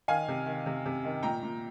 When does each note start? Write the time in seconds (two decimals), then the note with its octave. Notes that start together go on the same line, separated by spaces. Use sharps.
0.08 D#3 F5 G#5
0.28 C3
0.46 D#3
0.66 C3
0.86 C3
1.04 D#3
1.23 A#2 G5 A#5
1.43 A#2